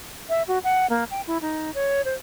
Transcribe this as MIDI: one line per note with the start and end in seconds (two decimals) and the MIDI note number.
0.29 0.43 76
0.48 0.59 66
0.64 0.86 78
0.90 1.04 58
1.11 1.21 79
1.27 1.38 64
1.41 1.73 63
1.74 2.02 73
2.05 2.14 72